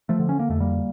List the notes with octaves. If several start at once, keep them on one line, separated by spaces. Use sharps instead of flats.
F3 A3
D3
C#4
A#3
F2 A3
G3 A#3